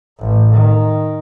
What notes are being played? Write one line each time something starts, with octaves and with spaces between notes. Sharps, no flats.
A1
D#3